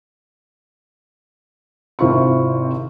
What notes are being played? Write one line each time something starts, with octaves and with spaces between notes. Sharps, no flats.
G#1 C3 C4 E4 F4 C#6